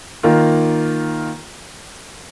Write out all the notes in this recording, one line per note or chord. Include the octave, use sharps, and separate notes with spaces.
D#3 A#3 F4